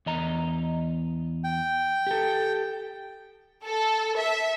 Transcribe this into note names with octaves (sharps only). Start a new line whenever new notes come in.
E2 D#5 A#5
G5
G4 A4
A4
E5